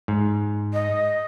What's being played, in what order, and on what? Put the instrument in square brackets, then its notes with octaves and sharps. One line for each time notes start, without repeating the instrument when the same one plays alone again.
[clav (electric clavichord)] G#2
[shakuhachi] D#5